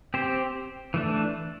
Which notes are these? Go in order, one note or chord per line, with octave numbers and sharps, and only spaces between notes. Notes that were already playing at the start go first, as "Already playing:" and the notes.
C4 G4 C5
E3 A3 D4